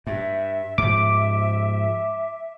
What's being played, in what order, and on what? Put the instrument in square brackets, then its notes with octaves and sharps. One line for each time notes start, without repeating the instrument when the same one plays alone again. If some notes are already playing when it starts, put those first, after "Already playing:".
[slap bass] G2 [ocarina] E5
[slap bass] G#2 F3 [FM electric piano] D6